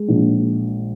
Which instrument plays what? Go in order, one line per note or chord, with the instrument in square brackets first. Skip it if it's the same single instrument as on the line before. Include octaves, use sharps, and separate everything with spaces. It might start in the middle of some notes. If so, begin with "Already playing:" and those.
Already playing: [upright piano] G#3
A#1